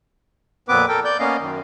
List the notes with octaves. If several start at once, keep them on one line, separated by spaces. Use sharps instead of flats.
F2 A#2 B3 C4 B4 D6
A4 A#4 G5
D5 G6
A#3 B3 C#4 D#5 F5
F#2 D#3